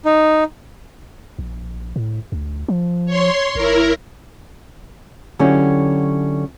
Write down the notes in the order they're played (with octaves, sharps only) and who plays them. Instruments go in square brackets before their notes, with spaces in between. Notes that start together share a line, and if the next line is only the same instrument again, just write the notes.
[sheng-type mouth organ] D#4
[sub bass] A#1
A2
D2
F3
[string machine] C#5 C6
[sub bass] G#1 [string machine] E4 A#4
[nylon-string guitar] D3 F#3 C#4 E4 F#4 G4